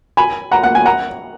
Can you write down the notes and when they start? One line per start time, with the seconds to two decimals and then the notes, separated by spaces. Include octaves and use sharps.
0.17 G#5 B5
0.52 F#5 A#5
0.63 F#5
0.75 G#5
0.86 F#5 A#5